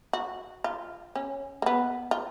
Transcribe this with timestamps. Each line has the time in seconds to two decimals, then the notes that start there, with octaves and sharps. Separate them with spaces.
0.13 F#4
0.64 F4
1.15 C#4
1.62 A#3
1.66 B3
2.11 F4